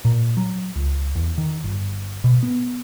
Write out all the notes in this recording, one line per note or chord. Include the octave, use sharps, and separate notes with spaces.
A#2
F#3
C#2
E2
D#3
G1
B2
B3